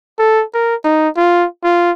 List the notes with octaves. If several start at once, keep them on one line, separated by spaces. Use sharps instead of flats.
A4
A#4
D#4
F4
F4